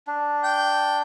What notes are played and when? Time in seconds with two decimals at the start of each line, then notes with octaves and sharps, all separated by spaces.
0.07 D4
0.43 G5